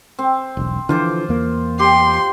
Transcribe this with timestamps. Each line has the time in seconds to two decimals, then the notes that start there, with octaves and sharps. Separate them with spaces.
0.19 C4
0.57 E1 B1
0.89 D3 E3 F3 F4 C5 D6
1.29 E2 A#3
1.79 G4 C6